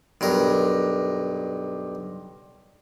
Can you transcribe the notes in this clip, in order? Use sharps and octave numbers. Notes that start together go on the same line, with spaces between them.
B1 G2 A#4